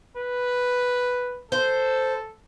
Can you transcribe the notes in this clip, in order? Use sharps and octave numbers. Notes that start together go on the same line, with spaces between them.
B4
A4 C5